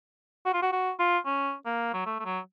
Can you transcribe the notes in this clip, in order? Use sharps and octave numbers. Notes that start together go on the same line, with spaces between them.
F#4
F4
F#4
F#4
F4
C#4
A#3
F#3
A3
A3
F#3